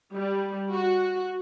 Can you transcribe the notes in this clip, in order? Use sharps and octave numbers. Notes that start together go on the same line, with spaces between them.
G3
F#4